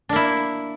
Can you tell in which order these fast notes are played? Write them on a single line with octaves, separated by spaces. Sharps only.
D4 A#3 E4